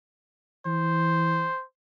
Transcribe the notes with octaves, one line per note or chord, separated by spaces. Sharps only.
E3 C5